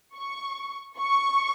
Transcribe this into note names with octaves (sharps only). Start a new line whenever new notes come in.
C#6
C#6